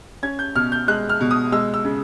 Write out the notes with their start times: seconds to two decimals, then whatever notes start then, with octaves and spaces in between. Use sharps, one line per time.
0.23 C#4 G#6
0.39 G6
0.55 B2 F6
0.72 G6
0.88 G#3 F#6
1.09 F6
1.21 B2
1.31 D#6
1.52 G#3 E6
1.74 E6
1.85 C#3